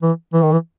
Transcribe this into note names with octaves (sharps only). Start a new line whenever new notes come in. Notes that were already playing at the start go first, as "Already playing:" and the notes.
E3
E3
D#3
E3